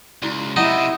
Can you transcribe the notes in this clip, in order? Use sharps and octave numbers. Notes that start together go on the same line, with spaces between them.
C#2 E4 F#4 D5
C3 D#4 E4 D#5 F#5